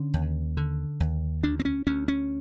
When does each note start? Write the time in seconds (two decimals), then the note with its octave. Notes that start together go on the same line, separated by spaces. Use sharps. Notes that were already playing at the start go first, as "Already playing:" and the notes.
Already playing: D3 C#4
0.14 D#2
0.57 D3
1.00 D#2
1.43 D2 D4
1.60 C4
1.65 C#4
1.87 D2 C#4
2.08 C#4